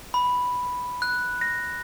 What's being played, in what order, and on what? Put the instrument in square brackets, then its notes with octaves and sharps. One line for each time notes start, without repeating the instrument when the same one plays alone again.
[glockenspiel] B5
F#6
A#6